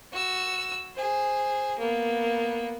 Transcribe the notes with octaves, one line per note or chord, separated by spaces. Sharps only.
F#4 E6
G#4 C5
A#3 B3